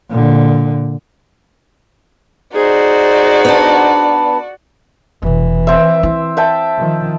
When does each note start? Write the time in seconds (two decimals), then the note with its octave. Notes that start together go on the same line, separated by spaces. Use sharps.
0.10 A#2 D3
2.55 D#4 F#4 G#4 C5 D5
3.45 B3 D4
5.22 F1 B2 E3
5.67 C4 E5
6.03 E4
6.37 E5 G5 A5
6.79 D#3 F3